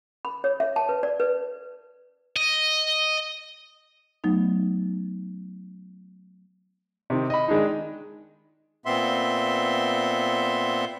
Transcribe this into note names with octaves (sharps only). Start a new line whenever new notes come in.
B5
C#5
E5
A5
B4
D5
B4
D#5
F#3 A3 B3 D#4
C3 D#3
D#5 B5
D#3 G#3 D4 D#4
A#2 B3 C4 E5 C6